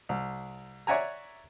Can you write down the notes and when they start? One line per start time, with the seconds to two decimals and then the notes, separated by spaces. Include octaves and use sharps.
0.09 C2
0.87 C#5 D5 E5 F#5 G#5 A#5